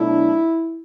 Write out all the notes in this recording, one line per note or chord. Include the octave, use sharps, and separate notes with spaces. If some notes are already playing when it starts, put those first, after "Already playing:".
Already playing: B2 F#3 A3 D4 E4